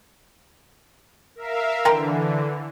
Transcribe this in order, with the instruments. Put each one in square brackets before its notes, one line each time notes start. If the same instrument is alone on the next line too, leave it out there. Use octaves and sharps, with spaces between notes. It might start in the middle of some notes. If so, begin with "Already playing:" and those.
[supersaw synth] A#4 E5 F5
[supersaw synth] D3 E3 [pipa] A#4 G5 C6